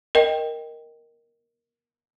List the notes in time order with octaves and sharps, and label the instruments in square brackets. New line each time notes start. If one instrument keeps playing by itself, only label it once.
[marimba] A#4 D#5 G5